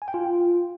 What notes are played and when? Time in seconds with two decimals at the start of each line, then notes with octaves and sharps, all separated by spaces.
0.02 G#5
0.08 G5
0.14 F4